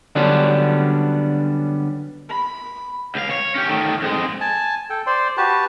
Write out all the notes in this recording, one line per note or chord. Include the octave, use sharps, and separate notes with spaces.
D3 F#3 G3 B3 C#4 D4
B5
C#2 F5
C#5
C#4 G4
D#3 A3
F2 G#3
G#5 A5
A4 G5
C5 D5 C6
F#4 G4 B4 A5